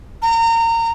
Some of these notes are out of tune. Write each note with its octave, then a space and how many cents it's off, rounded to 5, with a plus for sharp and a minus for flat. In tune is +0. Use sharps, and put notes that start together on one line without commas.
A#5 -25